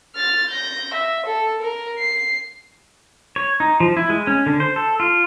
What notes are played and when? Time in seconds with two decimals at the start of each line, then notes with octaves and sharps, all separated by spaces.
0.15 F6 A6
0.49 G6 A#6
0.94 E5
1.26 A4
1.62 A#4
1.99 C7
3.36 C#5
3.60 D#4
3.80 F3
3.97 E4
4.10 G#3
4.27 C#4
4.46 D3
4.60 C5
4.76 A4
5.00 F4